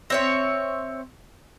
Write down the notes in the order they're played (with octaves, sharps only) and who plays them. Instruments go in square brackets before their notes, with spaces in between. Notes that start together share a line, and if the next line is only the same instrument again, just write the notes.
[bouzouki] C4 C#5 E5